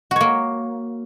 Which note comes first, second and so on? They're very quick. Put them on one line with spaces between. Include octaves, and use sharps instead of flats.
F#4 C#5 A#3